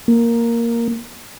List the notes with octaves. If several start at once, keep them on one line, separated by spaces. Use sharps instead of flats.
A#3